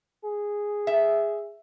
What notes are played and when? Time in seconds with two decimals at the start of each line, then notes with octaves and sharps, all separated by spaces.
0.25 G#4
0.87 E5